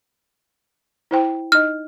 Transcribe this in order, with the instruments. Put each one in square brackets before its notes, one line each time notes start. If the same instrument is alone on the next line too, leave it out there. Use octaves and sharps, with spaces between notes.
[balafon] E4 C5 G5
[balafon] D#4 D#5 [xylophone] F6